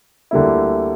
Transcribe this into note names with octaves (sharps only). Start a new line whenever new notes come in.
D2 D3 G3 A#3 E4